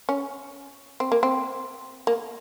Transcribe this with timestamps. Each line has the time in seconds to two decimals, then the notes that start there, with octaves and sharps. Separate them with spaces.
0.09 C#4
1.00 C4
1.12 A#3
1.23 C4
2.07 A#3